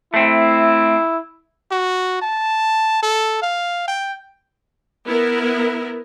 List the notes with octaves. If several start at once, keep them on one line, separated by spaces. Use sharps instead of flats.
A3 C4 E4
F#4
A5
A4
F5
G5
B3 E4 A#4